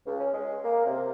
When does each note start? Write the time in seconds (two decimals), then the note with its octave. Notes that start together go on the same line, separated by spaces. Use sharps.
0.06 C#2
0.19 C#4
0.33 G#3
0.64 A#3
0.86 C3